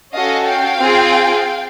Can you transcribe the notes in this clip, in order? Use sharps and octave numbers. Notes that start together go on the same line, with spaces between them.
C#4 F#4 A4 D#5 F5
F5 G5
C4 F4 G#4